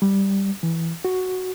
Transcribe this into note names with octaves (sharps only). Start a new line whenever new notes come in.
G3
E3
F#4